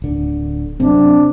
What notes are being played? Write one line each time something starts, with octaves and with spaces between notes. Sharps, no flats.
D1 D3
F#2 C3 C4 D4